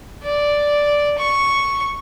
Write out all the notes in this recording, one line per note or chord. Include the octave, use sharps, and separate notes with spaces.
D5
C#6